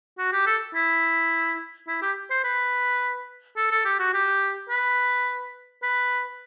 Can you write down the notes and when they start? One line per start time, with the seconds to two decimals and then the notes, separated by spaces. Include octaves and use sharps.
0.18 F#4
0.33 G4
0.47 A4
0.75 E4
1.88 E4
2.02 G4
2.30 C5
2.44 B4
3.57 A4
3.71 A4
3.85 G4
3.99 F#4
4.14 G4
4.70 B4
5.83 B4